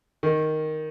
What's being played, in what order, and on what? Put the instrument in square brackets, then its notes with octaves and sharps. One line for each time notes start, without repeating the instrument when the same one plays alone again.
[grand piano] D#3